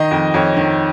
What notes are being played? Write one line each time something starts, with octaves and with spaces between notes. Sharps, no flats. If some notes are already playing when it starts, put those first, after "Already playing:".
Already playing: D#3 D#5
F2
F2 C#5
D#3